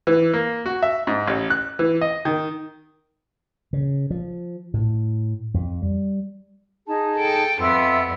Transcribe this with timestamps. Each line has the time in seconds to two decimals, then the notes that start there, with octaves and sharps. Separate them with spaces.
0.07 E3
0.33 A#3
0.66 F#4
0.83 E5
1.07 G#2
1.27 A1
1.50 F#6
1.79 E3
2.01 D#5
2.25 D#3
3.73 C#3
4.10 F3
4.74 A2
5.54 F2
5.82 G3
6.87 D#4 G#4 A5
7.18 A4 G5
7.61 F2 B3 E5 C6 E6